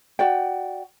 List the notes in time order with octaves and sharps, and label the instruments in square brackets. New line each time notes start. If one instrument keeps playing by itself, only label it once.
[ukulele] F#4 D5 G5